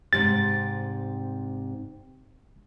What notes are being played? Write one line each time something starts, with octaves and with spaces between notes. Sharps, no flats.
G#2 C3 G3 A6